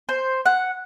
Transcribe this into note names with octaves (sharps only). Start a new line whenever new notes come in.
C5
F#5